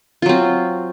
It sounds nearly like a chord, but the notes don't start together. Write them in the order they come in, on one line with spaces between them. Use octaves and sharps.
F4 F#3 C4